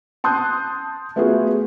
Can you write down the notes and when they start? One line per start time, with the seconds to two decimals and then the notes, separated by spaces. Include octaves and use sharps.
0.24 A5 C6 D#6 F#6 G6
1.16 A3 B3 F4 F#4 G#4